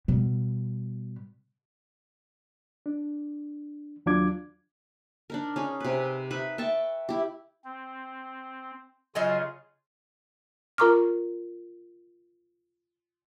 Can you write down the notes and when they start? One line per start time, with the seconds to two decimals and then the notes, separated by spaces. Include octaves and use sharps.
0.08 B2 G3
2.86 D4
4.06 D#2 F#3 D4 F4 D6 G#6
5.30 D4 D#4 A#4
5.56 C#4 D#4 G#4
5.80 C3 B4
6.30 D#4 B4 E5 B5
6.58 E5 G5 A5 C#6
7.09 E4 G4
7.65 C4
9.15 C#3 F#3 F4 G#4 D#5 G#5
10.78 F4 A#4 A#5 C#6 D6 F6